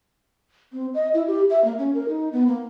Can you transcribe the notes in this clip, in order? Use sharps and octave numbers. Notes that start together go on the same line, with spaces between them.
C4
D#5
E4
G4
E5
A#3
C#4
A#4
D#4
B3
A#3